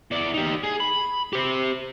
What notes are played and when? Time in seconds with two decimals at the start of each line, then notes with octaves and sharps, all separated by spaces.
0.11 E2 D5
0.35 D#4 G4
0.64 G#4
0.80 B5
1.33 G4 C5